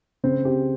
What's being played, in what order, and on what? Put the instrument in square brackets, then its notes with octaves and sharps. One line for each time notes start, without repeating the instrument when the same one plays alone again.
[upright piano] C#3 [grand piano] C4
[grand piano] G4